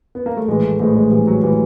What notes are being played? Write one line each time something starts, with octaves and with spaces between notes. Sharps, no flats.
B3
A#3
A3
A#1 A2 E3 G#3
A3
A#1 A2 E3 G#3
G#3
A#1 A2 E3 G3
F#3
A2 E3 G3